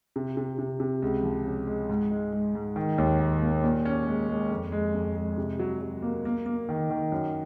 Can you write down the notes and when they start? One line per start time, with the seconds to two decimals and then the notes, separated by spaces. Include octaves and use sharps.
0.16 C3
0.37 C3
0.58 C3
0.80 C3
1.02 C#2
1.23 F3
1.45 C#3
1.67 G#3
1.90 G#2
2.11 G#3
2.33 G#3
2.55 G#2
2.76 D#3
2.98 D#2
3.20 D#3
3.42 A#3
3.64 A#2
3.85 C#4
4.07 G#3
4.29 G#3
4.51 F2
4.72 G#3
4.94 F2
5.16 G#3
5.38 C3
5.59 F#3
5.81 F#3
6.02 A#3
6.25 A#3
6.46 A#3
6.69 D#3
6.90 D#3
7.12 F#2